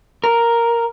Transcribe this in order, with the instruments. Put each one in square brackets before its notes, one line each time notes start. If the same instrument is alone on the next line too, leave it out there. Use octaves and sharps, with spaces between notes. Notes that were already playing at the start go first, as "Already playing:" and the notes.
[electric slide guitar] A#4